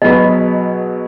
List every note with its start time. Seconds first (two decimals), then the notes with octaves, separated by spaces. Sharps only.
0.02 B2 F#3 G#4 B4 D#5 B5